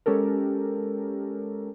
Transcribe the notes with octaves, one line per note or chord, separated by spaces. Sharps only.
G#3 C#4 G4 A4 A#4